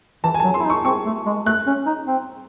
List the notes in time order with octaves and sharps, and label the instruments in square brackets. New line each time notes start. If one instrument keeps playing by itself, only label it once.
[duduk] E3 [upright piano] A5
[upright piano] G#5
[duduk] F#3 [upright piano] A5
[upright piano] C6
[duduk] E4
D#4
[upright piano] C#6
[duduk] C4 [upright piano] C#6
[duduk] A3
G#3
[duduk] A3 [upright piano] F#6
[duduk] C#4
D#4
C4